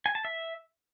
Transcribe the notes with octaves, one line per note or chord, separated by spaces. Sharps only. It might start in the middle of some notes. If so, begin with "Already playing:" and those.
G#5
A5
E5